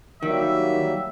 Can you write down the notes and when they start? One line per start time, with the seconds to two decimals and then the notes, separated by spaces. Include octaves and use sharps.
0.23 D#3 F#3 G3 A#3 E5